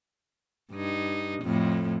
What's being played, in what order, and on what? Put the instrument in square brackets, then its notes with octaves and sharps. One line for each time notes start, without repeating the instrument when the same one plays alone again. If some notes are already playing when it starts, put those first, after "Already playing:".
[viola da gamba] G2 D#4
F2 A2